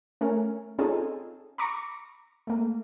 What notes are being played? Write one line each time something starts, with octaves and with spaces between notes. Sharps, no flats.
A3 C#4 A#4
C4 C#4 D#4 F4 G#4 A4
A#5 B5 C#6 D6 A#6 C#7
A3 A#3